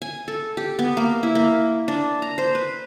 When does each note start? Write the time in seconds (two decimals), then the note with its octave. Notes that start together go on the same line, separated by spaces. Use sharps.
0.02 G#5
0.28 A4
0.57 G4
0.79 B3
0.97 A#3
1.23 E4
1.35 A#3
1.88 D4
2.22 A#5
2.38 C5
2.55 B4